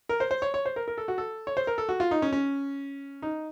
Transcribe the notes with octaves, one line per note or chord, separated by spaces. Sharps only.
A#4
C5
C5
C#5
C#5
C5
A#4
A#4
A4
F#4
A4
C#5
C5
A#4
A4
F#4
F4
D#4
C#4
C#4
D#4